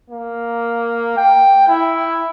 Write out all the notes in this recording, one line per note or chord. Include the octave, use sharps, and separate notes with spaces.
A#3
G5
E4